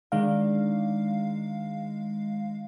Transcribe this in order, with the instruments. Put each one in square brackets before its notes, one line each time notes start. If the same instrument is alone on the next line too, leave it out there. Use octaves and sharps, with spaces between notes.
[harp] D#3 D4 A#4 [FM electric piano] G#3 F5